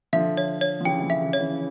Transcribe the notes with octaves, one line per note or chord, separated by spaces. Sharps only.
D3 F3 E5
C#5
C#5
F3
C#3 E3 G5
E3
D3 F3
E5
C#3 E3
C#5
C#3 E3